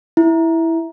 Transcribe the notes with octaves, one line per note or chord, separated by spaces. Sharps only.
E4